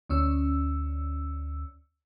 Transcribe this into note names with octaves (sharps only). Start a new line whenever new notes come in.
D2 C#4 E6